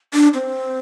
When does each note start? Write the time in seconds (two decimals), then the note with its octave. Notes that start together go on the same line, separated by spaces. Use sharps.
0.14 D4
0.34 C4